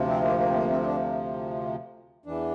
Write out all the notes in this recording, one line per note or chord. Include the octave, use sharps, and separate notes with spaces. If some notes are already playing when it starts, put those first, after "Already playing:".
Already playing: D2 C3 F3
C4
A#3
A#3
C4
A#3
C4
C4
D4
E2 E3 D4